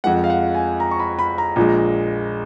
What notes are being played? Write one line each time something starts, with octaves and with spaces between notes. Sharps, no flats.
F2 F3 G#3 F#5
F5
F#5
G#5
A#5
C#6
B5
B5
A#5
A#1 A#2 F3 G#3